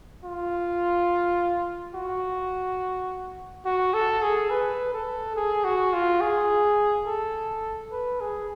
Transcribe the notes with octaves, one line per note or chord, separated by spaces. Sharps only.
F4
F#4
F#4
A4
G#4
B4
A4
G#4
F#4
F4
G#4
A4
B4
G#4